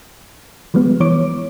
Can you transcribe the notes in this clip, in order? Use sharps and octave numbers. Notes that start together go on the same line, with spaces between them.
F3 G3 G#3 B3
E3 C#5 D6